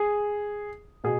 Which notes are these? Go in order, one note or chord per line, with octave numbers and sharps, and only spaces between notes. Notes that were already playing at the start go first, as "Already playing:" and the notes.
Already playing: G#4
B2 G#4